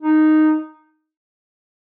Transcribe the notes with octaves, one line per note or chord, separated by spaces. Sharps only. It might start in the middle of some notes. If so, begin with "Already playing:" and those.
D#4